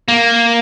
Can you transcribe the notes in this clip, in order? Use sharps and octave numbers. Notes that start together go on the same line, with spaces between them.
A#3